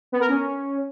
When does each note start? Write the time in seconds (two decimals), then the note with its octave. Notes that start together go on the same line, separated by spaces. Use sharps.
0.12 B3
0.20 A#4
0.29 C#4